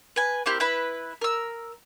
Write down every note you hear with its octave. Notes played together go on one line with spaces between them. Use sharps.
B4 G#5
A#3 C4 E4 G4
E4 B4 B5
A#4 E6